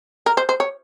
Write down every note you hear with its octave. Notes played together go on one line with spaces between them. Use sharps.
A#4
C5
C5
C#5